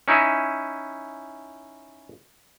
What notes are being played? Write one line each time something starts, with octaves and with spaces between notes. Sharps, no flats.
C#4 D#4 E4